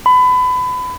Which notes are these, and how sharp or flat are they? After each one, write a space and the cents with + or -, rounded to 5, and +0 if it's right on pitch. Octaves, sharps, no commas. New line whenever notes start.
B5 +25